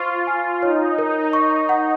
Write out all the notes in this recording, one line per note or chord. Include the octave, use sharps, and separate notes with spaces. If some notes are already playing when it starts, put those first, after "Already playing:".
Already playing: F4 C5 C#6
G#5
D#4 C#5
A#4
C#6
F#5